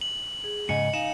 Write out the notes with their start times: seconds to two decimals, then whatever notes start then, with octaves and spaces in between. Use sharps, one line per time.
0.01 F#7
0.44 G#4
0.69 G#2 C#3 D#5 F#5 G#5 C#7
0.94 D#4 F5 G#5 E7